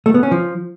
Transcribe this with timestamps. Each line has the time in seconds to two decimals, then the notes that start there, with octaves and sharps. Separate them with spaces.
0.06 A3
0.14 B3
0.23 C#4
0.31 F3